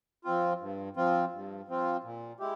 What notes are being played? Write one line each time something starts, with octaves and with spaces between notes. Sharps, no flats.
F3 C4 F4
G2
F3 C4 F4
G2
F3 C4 F4
A#2
G#3 E4 G4